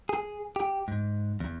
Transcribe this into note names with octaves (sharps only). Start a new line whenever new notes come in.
G#4
G4
G#2
E2